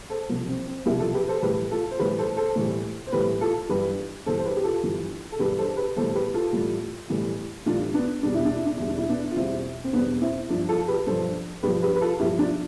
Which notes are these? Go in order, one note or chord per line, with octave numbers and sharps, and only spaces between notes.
A4 C5
C2 C3 F3
C4
C4
C2 C3 F3 E4 G4
F4 A4
G4 B4
A4 C5
A2 E3 G3 G4 B4
F4 A4
C5
A2 E3 G3 G4 B4
A4 C5
A4 C5
A2 E3 G3
C5
A2 E3 G3 G4 B4
F4 A4
G2 E3 G3 G4 B4
G2 E3 G3 A4 C5
C5
G4 B4
G4
F4 A4
G2 E3 G3
A4
G2 E3 G3 G4 B4
A4 C5
G4 B4
A2 E3 G3 A4 C5
G4 B4
F4 A4
A2 E3 G3
A2 E3 G3
A2 E3 G3 D4 F4
B3 D4
E2 B2 G3 D4
E4
D4
E4
D4
E2 B2 G3 E4
D4
E4
B3 D4
F4
E2 B2 G3 C4 E4
C4
E2 B2 G3 B3 D4
C4 E4
G2 F3 D4 F4
F4 A4
G4 B4
G2 F3 A4 C5
G2 F3 G4 B4
G4 B4
B4
F4 A4
G2 F3 E4 G4
D4 F4